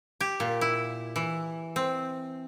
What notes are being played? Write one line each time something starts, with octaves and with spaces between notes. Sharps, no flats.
G4
A#2
E4
E3
C4